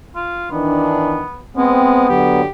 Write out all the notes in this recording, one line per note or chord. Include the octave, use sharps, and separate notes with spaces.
F4
D#3 E3 B3 D4
G#3 B3 C4
D3 F#3 G4